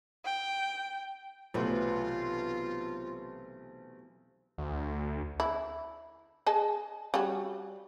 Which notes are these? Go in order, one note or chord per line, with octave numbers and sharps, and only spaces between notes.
G5
B1 C3 E3 A3 F4 B4
D2
E4
G#4 D#5 A5
G3 C#4 F#4